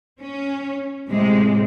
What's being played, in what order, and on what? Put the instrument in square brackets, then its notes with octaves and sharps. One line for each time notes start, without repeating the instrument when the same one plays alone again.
[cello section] C#4
A2 C3 G#3